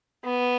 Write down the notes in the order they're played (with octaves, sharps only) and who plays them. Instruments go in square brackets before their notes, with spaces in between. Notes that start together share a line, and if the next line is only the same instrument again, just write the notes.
[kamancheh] B3